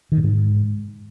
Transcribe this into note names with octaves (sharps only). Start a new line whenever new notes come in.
D#3
A#2
G#2